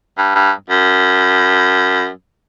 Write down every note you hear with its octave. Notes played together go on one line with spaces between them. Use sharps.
G2
G2
F#2